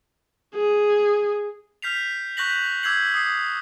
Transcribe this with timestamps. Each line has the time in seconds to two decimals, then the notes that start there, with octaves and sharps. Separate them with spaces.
0.55 G#4
1.82 F6 G6 B6 C7 F7
2.37 C#6 F#6 G6 A#6 B6 F#7
2.83 D6 E6 G6 G#6 C7 F#7
3.14 D#6 C7